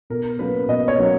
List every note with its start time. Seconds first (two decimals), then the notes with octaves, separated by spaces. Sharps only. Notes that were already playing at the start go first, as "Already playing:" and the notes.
0.10 B2 A#4
0.39 F#3 A#3 C#4 B4
0.68 B2 D#5
0.88 C#5
0.98 F#3 A#3 C#4